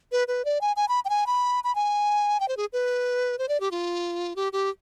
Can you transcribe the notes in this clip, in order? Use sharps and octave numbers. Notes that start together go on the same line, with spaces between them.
B4
B4
D5
G#5
G#5
B5
G5
G#5
B5
B5
G#5
G5
C5
G#4
B4
C5
D5
G4
F4
G4
G4